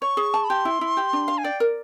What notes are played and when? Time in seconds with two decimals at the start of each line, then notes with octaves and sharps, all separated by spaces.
0.02 C#5 C#6
0.17 G#4
0.34 A5
0.44 B5
0.49 G4 C6
0.65 E4
0.81 E4
0.97 G4
1.13 D4
1.28 F5
1.38 G#5
1.44 D5 G5
1.60 A#4